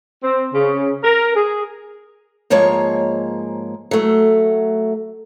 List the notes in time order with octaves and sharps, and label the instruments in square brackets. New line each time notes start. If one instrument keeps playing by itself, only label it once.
[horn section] C4
C#3
A#4
G#4
[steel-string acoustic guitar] G#2 F3 G#3 A#3 C#5
F#3 A3